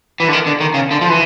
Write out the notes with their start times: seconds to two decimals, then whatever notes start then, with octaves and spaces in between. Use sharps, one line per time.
0.20 E3
0.28 D3
0.33 D#3
0.46 D3
0.61 D#3
0.74 C#3
0.91 D3
1.01 F3
1.09 E3